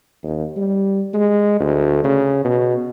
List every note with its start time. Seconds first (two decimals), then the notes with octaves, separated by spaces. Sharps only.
0.24 D#2
0.57 G3
1.14 G#3
1.60 D2
2.04 C#3
2.45 B2